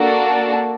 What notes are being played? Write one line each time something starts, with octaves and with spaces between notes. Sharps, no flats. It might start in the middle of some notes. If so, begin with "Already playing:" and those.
Already playing: A#3 D4 F#4 A4